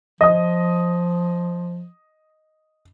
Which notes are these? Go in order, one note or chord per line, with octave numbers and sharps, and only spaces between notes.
F3 D#5 D#6